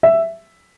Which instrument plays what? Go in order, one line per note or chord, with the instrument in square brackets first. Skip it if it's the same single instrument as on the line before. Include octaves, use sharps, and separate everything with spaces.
[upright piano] E5